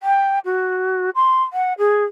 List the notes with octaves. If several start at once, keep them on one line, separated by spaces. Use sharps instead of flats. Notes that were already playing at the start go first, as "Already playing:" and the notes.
G5
F#4
C6
F#5
G#4